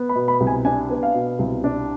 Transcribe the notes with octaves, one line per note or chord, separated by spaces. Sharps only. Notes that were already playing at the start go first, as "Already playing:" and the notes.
Already playing: B3
B5
B2
B5
C2
G#5
D4 G#5
B3
F5
B2
C2
D4